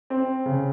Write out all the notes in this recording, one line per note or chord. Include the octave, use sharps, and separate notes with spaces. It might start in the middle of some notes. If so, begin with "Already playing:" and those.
C4
C#3